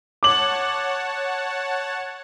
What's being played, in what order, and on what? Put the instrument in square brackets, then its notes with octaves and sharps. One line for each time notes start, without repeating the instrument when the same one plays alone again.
[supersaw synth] C#5 F#5 A5 [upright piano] D6 F#7